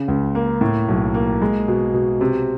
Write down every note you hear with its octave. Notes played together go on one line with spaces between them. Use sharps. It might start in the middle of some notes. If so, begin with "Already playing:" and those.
Already playing: C#3
C#2
A#3
A2
B1
A#3
G#3
B2
B2
C3